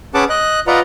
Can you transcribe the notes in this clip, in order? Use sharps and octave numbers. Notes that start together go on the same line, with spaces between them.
C#4 G#4 B4 F#5 A5 D6
D#5 F#6
F4 B4 D5 D#5 F#5 A#5